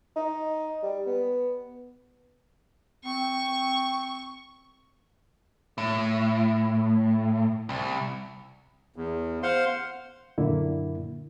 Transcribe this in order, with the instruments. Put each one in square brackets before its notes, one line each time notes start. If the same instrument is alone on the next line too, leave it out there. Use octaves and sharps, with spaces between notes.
[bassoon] D#4
G3
B3
[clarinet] C4 [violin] C#6
[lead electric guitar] A2
C2
[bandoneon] E2
C5 F5 F#5 C6
[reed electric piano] F#2 A#2 D3 A#3 E4